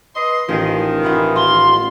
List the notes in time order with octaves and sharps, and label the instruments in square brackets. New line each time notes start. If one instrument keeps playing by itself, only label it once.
[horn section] B4 D#5 C6
[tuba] A1 [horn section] D#3 [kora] F3 G#4
[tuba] A1 [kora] E3 B3 F4
[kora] F4 [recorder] C6